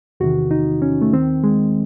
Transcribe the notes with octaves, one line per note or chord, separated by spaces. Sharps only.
E2 C3 D#3 F#4
D#4
C#4
A3
D#2 D#3 C4
G#3